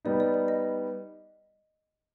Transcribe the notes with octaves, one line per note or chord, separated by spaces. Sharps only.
G3 B3 D#4 D5
D5
D5
D#5